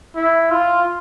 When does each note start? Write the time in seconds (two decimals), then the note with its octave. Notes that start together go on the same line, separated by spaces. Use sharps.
0.16 E4
0.51 F4